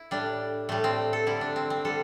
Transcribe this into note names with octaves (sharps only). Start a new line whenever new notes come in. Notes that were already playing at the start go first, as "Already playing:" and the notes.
Already playing: E4
A2 G3 D4
A2 G3 A3
C4
A4
D3 G3 E4
D4
C4
C4
D3 G3 A4